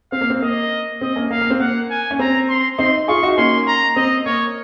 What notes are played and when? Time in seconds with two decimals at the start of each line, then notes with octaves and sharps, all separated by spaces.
0.12 C4 F5
0.21 A#3
0.30 C4
0.42 A#3 D#5
1.01 C4 D#5
1.16 A#3 C#4
1.31 A#3 F5
1.41 A#3
1.50 C4
1.60 A#3 F#5
1.90 G#5
2.11 C#4
2.19 C4 A#5
2.49 C6
2.78 C4 D#4 C6
3.08 F4 G#4 C#6
3.23 D#4 F#4
3.37 A#3 C#4 C6
3.67 A#5
3.96 C4 D#5
4.26 A#3 C#5